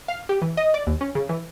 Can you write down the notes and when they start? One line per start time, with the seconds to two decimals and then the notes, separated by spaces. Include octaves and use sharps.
0.08 F5
0.29 G4
0.42 E3
0.57 D#5
0.74 D5
0.87 D#2
1.01 C#4
1.15 C#3
1.29 E3